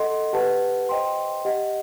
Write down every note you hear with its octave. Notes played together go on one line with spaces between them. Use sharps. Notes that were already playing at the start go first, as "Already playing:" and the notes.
Already playing: A4 D#5 F#5 C6
G4 B4 F#5 A5
C5 D#5 G5 C6
G4 D#5 F#5